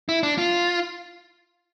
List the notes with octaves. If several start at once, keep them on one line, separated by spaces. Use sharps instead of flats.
E4
D4
F4